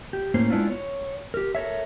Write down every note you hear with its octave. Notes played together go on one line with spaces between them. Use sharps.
G4
A2 A#3 C#4 C5
G#3 B3 D4 E4 F4
C#5
G4 A#4
A4 A#4 C#5 E5